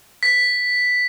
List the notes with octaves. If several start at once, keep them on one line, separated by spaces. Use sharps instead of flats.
B6